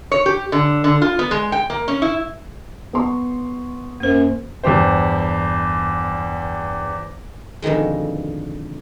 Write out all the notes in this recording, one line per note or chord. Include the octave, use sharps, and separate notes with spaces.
C#5
G4
D3
D3
F4
B3
G#3
G5
A#3
C#4
E4
B3 C6 C#6
F#2 A#3 C5
E2 G2 G4 C5
F2 B2 D3 D#3 G#3